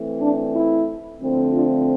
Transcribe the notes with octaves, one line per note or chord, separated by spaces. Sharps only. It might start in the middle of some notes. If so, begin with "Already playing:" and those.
Already playing: E3 A3 C4
D4
E4
D3 F3 A3 C4
D4 F4